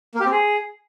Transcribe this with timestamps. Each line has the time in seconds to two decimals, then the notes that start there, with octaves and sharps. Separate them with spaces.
0.15 A#3
0.20 G4
0.26 C4
0.31 G#4